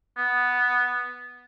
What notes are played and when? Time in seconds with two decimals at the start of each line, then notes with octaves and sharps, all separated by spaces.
0.17 B3